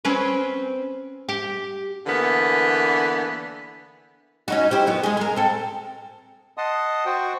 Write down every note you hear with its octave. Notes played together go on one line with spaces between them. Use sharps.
C4 C#4 B4
G4
D3 E3 A#3 B3
C#4 D#4 F#4
E4 G4 C5
F#2 B3 F#4
G#3 G#4
G#4 A#4
C4 A4
D#5 F#5 A5 C6 D#6
F#4 C5 F#5 G5